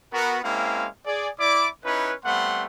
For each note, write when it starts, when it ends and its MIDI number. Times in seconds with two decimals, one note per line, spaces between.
0.13 0.38 59
0.13 0.38 66
0.13 0.38 70
0.44 0.87 56
0.44 0.87 58
0.44 0.87 60
0.44 0.87 61
0.44 0.87 64
0.44 0.87 77
1.06 1.29 68
1.06 1.29 74
1.39 1.68 64
1.39 1.68 74
1.39 1.68 86
1.85 2.13 61
1.85 2.13 63
1.85 2.13 64
1.85 2.13 71
2.26 2.65 55
2.26 2.65 57
2.26 2.65 59
2.26 2.65 60
2.26 2.65 78
2.26 2.65 84